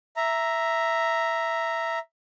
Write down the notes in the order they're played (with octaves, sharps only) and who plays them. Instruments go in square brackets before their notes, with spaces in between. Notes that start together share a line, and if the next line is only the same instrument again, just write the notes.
[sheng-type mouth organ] E5 A#5